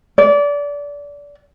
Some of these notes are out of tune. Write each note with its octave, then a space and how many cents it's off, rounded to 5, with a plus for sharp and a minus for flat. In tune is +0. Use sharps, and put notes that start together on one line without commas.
D5 -25